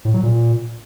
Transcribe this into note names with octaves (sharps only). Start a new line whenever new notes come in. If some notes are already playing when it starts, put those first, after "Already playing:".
A2
F#3
A#2